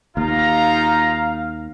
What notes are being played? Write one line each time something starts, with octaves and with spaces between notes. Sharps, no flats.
D#2 D#4 F4 F5 A#5